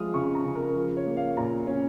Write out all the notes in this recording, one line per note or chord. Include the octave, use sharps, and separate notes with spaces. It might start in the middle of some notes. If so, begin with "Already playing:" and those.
Already playing: F3 G#3 D#6 F6
C#3 C#6
A#5
C#3
A#4
F3
C#5
A#3
F5
A#2 A#5
C#4